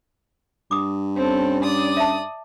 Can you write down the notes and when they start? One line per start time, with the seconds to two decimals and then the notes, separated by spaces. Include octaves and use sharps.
0.71 G2 D6 D#6
1.16 C4 C#4 A4
1.62 D5 D#6
1.97 E5 A5